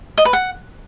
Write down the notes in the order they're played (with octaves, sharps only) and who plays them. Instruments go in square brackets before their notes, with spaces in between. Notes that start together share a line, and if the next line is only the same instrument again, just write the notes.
[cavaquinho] D#5
B4
F#5